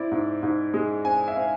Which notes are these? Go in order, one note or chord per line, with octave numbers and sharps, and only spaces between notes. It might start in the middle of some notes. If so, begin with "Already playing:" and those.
Already playing: C4 E4 D5
G#2
G#2
G#3
C4 G#5
E5
C4 F5